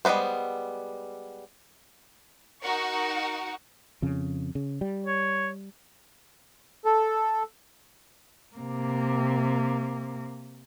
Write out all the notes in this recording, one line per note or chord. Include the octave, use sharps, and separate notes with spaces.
G3 G#3 A#3 B3 C5
D#4 F#4 A#4 F#5 C#6
F2 C#3
C#3
G3
C#5
A4
C3 A#3